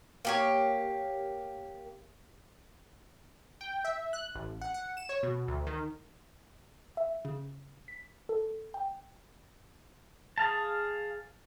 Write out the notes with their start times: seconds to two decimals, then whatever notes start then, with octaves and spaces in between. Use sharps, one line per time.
0.25 A#3 G4 C#5
3.61 G5
3.85 E5
4.13 F#6
4.35 A1
4.61 F#5
4.74 F#5
4.97 E7
5.09 C#5
5.23 B2
5.48 D2
5.67 D#3
6.97 E5
7.25 C#3
7.88 B6
8.29 A4
8.74 G5
10.38 G#4 F5 A5